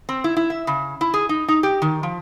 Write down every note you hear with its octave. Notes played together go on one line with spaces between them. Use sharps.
C4
E4
E4
E5
C#3
E4
G#4
D#4
D#4
G4
D#3
F3